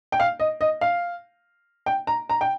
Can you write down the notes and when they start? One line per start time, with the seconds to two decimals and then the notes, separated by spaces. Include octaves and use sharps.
0.12 G5
0.20 F5
0.40 D#5
0.61 D#5
0.81 F5
1.86 G5
2.07 A#5
2.30 A#5
2.41 G5